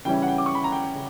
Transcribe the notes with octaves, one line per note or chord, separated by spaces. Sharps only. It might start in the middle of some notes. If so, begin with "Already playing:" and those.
C#3 E3 G3 C#4 E4 G5
F#5
G5
D6
C#6
B5
A#5
G5
C#3